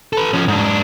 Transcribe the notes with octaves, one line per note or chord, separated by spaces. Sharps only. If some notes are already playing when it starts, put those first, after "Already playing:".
A4 B4
F3 C#4
G#2 D4